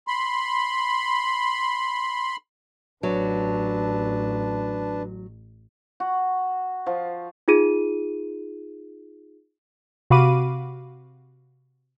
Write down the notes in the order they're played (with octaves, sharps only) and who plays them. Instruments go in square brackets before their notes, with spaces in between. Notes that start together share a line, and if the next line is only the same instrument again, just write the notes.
[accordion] B5 C6
[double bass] A1 [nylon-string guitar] F#3 B3 [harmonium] D4 B4 A5
[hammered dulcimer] F#4
F3
[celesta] D#4 F4 G#4 D#7
[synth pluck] C3 F#4 F5 B5 D6 D#7